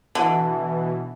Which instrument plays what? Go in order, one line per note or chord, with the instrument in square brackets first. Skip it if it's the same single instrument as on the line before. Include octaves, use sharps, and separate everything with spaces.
[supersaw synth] B2 E3 [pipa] D3